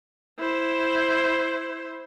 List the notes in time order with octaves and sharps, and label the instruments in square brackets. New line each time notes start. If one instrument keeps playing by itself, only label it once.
[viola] E4 C5